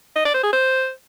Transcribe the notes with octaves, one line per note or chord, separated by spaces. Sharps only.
D#5
D5
C5
G#4
C5